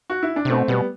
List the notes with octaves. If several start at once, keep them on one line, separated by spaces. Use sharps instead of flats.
F#4
E4
D4
C3
B2 A3 C4
B2 G3 B3